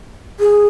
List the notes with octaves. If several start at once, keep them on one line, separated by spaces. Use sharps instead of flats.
G#4